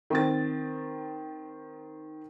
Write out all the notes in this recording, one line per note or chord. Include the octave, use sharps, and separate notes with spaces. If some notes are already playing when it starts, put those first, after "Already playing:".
D#3 C4 A6